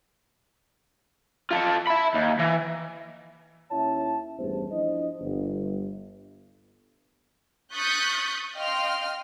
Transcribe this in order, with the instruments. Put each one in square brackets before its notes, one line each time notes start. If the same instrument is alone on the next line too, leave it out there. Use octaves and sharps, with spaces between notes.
[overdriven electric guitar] F4 A4
E5 B5
D#2
E3
[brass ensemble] D#2 C#4 E4 C#5 E5 A5
A1 E2 G2 B3 G#4 C5
F3 D4 E4 C5 D#5
G1
[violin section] C#6 D#6 F#6 G6 A6 B6
D#5 F5 G5 C6 F6